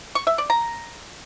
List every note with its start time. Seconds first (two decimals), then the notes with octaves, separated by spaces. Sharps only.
0.15 C#6
0.27 E5
0.38 D5
0.50 A#5